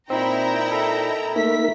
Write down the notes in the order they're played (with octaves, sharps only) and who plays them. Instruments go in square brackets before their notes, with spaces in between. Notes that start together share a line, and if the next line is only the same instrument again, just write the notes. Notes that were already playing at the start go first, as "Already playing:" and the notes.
[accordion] A#2 D#4 [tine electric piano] C4 [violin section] E4 G5 A#5
[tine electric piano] A4
[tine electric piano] A3 [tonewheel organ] A#3 D#4 A#4 [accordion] E5 [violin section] B6